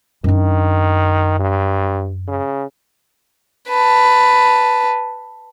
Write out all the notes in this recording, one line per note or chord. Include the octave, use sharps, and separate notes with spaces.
F#2 D#3 D4
G2
C#3
B4 A5